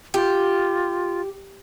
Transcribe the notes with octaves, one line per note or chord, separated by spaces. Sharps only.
F4 G4